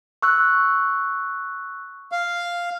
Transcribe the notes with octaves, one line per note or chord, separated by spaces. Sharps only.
C#6 E6 F#6
F5